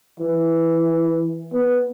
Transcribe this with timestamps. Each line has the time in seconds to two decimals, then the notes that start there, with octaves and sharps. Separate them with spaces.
0.19 E3
1.52 B3